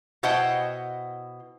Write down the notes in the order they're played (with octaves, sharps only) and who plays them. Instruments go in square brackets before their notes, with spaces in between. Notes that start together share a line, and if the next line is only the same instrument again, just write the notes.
[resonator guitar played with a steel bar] B2 E4 C5 D#5 F#5 G5